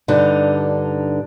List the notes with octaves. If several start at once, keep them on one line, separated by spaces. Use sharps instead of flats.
G2 D3 D#4